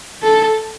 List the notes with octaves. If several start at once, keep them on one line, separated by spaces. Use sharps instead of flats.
A4